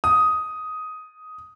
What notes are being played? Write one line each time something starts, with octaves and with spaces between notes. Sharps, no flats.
D#6